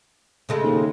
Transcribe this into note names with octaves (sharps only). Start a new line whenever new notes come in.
C#3 G#3 A3
D#2